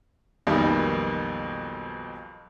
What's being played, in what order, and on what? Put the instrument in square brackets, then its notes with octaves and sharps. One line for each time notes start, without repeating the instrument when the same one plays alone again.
[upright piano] B1 F2 B2 D#3 G3 A#3